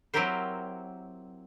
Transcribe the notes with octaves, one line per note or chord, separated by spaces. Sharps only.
F#3 C4 E4 G4 A#4 C5